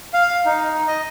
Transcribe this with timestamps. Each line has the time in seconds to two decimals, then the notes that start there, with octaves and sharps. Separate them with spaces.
0.14 F5
0.46 D#4
0.87 D#5